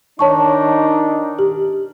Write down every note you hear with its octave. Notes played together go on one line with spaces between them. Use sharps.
D#3 D4 D#4 C#5 A5 C#6
G4